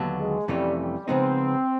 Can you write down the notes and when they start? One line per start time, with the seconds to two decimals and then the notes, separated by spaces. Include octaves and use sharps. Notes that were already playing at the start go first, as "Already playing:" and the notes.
Already playing: D#2 D3 F#3 B3
0.19 G#3
0.48 F2 C3 E3 G3 A3 C#4
0.78 G3
1.08 C#3 F3 G#3 B3 C4 D#4